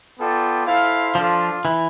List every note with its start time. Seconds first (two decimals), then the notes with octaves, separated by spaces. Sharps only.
0.18 B3 F4 A4 D5 G5
0.67 E4 A4 C5 F5
1.15 F3 D4 F4 A4
1.65 E3